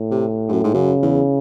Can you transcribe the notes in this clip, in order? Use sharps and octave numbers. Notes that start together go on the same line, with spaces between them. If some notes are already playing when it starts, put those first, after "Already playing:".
Already playing: A2
C3
G#2
F#2
G#2
F#2 C#3
E2